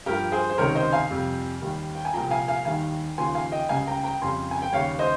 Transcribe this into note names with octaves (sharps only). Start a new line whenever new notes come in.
G2 F3 G4 A#4
G#4 C5
C5
C#2 C3 D#3 A#4 C#5
C5 D#5
F5 G#5
F2 C3 G3
D#2 D#3 G3
G5
G#5
C2 A#2 F3 G5 A#5
F5 G#5
F5 G#5
D#2 D#3 G3 F5 G#5
D#2 C#3 F3 G#5 C6
F5 G#5
D#5 G5
C#2 C#3 G3 F5 G#5
G5 A#5
G5 A#5
F2 C#3 G3 G#5 C6
G#5
G5
D#2 C#3 G3 C#5 F5
C5 D#5